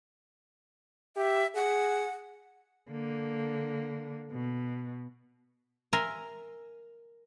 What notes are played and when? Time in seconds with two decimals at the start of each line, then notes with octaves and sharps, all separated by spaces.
1.17 G4 E5
1.55 G#4 F#5
2.91 D3 A#3
4.31 B2
5.93 A#4 E5 G#5 A#5 C6